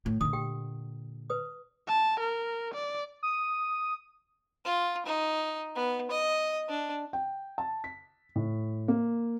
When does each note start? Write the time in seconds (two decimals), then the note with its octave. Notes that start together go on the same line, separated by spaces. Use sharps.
0.06 A2
0.21 A#2 D3 D#6
0.33 G4 G5
1.30 B4 D#6
1.88 A5
2.20 A#4
2.74 D5
3.23 D#6
4.65 F4
5.06 D#4
5.76 B3
6.11 D#5
6.69 D4
7.13 G5
7.58 A5
7.84 B6
8.36 A2
8.88 A#3